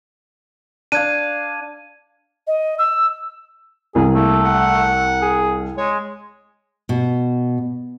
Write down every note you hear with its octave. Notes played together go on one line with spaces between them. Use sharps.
D4 F5 G#6 D#7
D#5
E6
C2 G#4
A3 A#3
F#5
G#4
G#3 C#5
B2